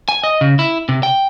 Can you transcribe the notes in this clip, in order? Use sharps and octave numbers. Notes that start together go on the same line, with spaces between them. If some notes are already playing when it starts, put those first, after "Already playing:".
G#5
D#5
C#3
E4
C3
G5